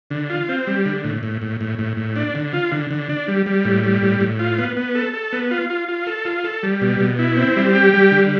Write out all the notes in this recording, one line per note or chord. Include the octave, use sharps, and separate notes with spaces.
D3
F4
C4
G3
D3
A2
A2
A2
A2
A2
A2
D4
D3
F4
D3
D3
D4
G3
G3
A2
G3
A2
A2
F4
B3
B3
A4
A4
B3
F4
F4
F4
A4
F4
A4
G3
B2
B2
E4
C4
G3
G4
G3
D3